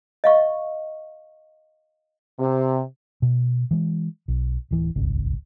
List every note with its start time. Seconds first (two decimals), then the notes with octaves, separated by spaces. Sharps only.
0.24 D#5 F5 C#6
2.39 C3
3.22 B2
3.71 E3 G#3
4.28 B1
4.71 D1 E3
4.95 D#1 G#1 C#2